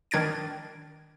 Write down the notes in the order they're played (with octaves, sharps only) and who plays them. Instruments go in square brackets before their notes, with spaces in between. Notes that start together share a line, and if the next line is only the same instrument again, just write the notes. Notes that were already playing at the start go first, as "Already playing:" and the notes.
[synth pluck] D#3 D4 G#6 A6 D7